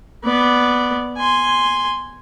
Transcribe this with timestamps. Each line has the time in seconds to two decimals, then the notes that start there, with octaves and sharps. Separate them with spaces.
0.24 B3 D5
1.18 G#5 C6